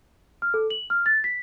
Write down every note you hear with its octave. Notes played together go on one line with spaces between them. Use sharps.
F6
A4
F#7
F6
A6
B6